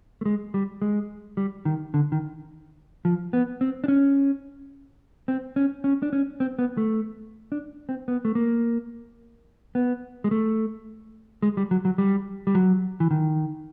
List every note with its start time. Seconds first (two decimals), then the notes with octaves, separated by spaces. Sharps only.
0.21 A3
0.26 G#3
0.54 G3
0.82 G#3
1.37 G3
1.65 D#3
1.94 D3
2.12 D#3
3.05 F3
3.33 B3
3.61 C4
3.84 D4
3.88 C#4
5.28 C4
5.56 C#4
5.84 C#4
6.03 D4
6.13 C#4
6.40 C4
6.59 B3
6.77 A3
7.52 D4
7.89 C4
8.08 B3
8.25 A3
8.35 A#3
9.75 B3
10.24 G#3
10.31 A3
11.43 G#3
11.57 G3
11.71 F#3
11.85 F#3
11.98 G3
12.47 G3
12.55 F#3
13.00 E3
13.11 D#3